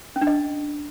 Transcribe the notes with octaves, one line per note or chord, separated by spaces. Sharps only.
C#4
D4
D#5